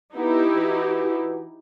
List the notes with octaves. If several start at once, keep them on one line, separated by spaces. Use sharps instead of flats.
B3 D#4 E4 G4
E3 F#4 B4